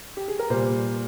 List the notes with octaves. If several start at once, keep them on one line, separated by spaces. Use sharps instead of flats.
G4
G#4
A#4
A#2 G3 C5